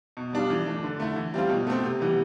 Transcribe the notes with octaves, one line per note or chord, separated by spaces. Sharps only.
B2
G3 D4 F4
E3
A3 D4
D3
A3 E4
E3
G3 C4 F4
B2
A3 C4
C3
E3 G3 B3